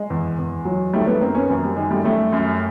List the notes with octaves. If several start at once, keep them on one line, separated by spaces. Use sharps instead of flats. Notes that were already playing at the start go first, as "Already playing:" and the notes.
Already playing: G#3
E2
E2
F#3
D#3 G3 A3
A3 B3
F#2 A#3 C4
B3 C#4
F#2 A#3 C4
G3
D#3 G#3
G3 A3
F#2 G3 A3
F#2